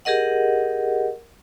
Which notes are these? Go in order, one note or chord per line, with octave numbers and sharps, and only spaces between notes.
G4 G#4 A#4 D#5 F#5